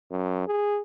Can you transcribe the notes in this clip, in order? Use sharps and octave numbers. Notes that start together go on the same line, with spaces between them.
F#2
G#4